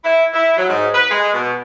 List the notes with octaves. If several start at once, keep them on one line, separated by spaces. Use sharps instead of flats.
E4
E4
F#3
G#2
B4
G#3
B2